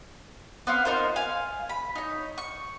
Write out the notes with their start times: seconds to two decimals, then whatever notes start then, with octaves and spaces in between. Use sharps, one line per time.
0.67 B3 C4 F5
0.85 D#4 F4 A#4 C5
1.16 F5 G#5
1.69 B5
1.96 D#4 C#5
2.38 C#6